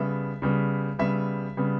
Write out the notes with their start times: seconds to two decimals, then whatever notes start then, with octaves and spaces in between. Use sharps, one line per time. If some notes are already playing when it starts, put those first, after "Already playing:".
Already playing: C#3 G3 B3 E5
0.42 C#3 G3 B3
0.99 C#3 G3 B3 E5
1.57 C#3 G3 B3